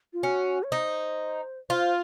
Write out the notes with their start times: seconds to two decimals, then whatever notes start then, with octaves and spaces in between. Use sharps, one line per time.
0.13 F4
0.23 C#4 F#4
0.63 C#5
0.71 D#4 C5
1.70 F4 C5